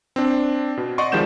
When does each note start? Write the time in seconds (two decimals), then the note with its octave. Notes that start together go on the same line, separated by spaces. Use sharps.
0.16 C4 D4
0.77 B2
0.98 D5 D#5 F#5 C6 C#6
1.12 D#3 F3 G3 G#3 G6 E7